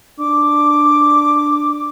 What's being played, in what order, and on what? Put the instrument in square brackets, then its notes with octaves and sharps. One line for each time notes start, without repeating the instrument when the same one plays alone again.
[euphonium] D4 [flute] D6